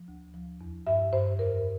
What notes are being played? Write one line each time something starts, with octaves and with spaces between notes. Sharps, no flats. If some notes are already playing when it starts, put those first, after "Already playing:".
Already playing: F3
D2
F3
E2
G2 E5
G2 C5
F2 A#4